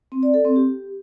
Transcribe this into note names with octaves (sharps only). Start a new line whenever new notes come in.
C4
D5
A4
C4
G4